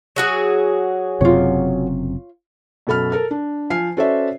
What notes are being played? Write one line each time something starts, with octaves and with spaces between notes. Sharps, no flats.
F#3 F#4 G#4
F#1 F#2 C3 F4 C#5
F#2 B2 A4 B5 F6
A4 A#4 F6
D4
F3 G#5 F6 C7
C#4 F#4 A4 C5 D5 E5